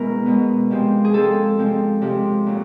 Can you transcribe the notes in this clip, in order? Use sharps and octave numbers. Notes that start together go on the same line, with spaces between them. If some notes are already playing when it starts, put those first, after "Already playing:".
Already playing: B2 G#3 B3 E4 A#4
B2 G#3 B3
C3 F3 G#3 C4
G#4
C3 F3 G#3 C4 A4
C3 F3 G#3 C4
C3 F3 G#3 C4
A#2 F#3 A#3